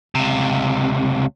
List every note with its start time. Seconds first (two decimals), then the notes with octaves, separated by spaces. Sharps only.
0.15 C#2 C3